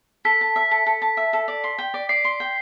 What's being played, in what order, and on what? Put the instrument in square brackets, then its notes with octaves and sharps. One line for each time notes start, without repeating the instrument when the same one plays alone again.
[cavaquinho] A4 [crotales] B6
[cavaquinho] A5
E5
A4
A4
A5
E5
A4
D5
C6
G5
D5
[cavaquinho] D5 [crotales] C7
[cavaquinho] C6
G5